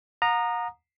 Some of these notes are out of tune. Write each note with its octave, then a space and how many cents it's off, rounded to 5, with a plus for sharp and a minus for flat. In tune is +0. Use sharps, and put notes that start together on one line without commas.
F#5 -45 A#5 +0 D#6 -25